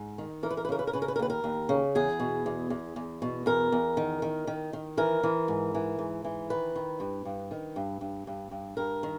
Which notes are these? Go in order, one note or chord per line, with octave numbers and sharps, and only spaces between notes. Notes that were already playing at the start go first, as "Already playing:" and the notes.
Already playing: G#2
D#3
E3 A#4
B4
A#4
B4
C#3 A#4
B4
A#4
C#3 B4
A#4
B4
A#4
D#2 B4
A#4
D#2
C#3
E2 G#4
B2
E2
E2
E2
B2
E2 A#4
E2
D#3
D#3
D#3
D#3
E3 A#4
E3
G#2
E3
G#2
E3
D#3 B4
D#3
G2
G2
D#3
G2
G2
G2
G2
G2 A#4
D#3